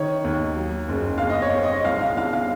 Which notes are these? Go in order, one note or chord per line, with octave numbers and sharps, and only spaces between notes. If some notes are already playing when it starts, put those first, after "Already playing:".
Already playing: D#3 C#5
D#2
F#3
F#1
C4 F5
D#5
C#5
C4
D#5
C2 F5
F5
C2 F5
F5